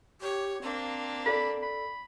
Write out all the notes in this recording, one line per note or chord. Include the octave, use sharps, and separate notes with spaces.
G4 C#5
A#3 C4 D4
A4 D5 B5
B5